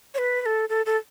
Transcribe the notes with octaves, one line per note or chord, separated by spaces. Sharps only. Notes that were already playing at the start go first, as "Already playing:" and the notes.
C#5
B4
B4
A4
A4
A4